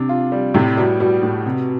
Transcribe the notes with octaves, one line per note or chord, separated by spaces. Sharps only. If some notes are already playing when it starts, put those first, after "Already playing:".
Already playing: C3 D4
F4
G3
A2 C3
B2 G3
B2 G3
A2
C3